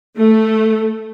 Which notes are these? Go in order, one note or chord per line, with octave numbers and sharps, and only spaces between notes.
A3